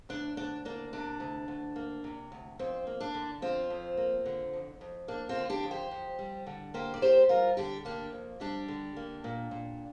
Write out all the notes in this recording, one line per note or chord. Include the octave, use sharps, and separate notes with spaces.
D2 D4
D2 D4
A#3 D4
C3 D4
D2
D2
A#3
C3
D2
F2 C4
A#3
D4
D3
F2 C4 F4
F2
A#3
D3
F2
F2
A#3 D4
C4 F4
D3
D4 G4
F2
G4 C5
F2
G3
D3
A#3 G4 C5
D5
F2 G4 C5
G3 F4 A#4
D3 D4 G4
A#3 D4 G4
F2
G3 D4 G4
D3
A#3
A#2
A#2